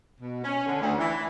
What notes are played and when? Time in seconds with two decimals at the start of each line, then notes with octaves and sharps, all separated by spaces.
0.20 B2
0.43 C#4
0.66 D3
0.81 D2
0.98 E3